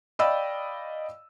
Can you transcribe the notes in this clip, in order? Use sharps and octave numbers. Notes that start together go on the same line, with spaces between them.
D5 D#5 F5 G5 B5 E6